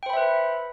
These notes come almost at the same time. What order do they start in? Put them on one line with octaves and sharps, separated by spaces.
G5 C5 B5 E5 B4